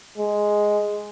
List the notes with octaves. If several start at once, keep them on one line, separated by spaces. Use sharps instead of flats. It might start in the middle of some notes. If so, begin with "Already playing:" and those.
G#3